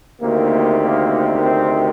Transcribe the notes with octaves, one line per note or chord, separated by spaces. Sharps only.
D2 C3 D#3 A#3
A#3
C4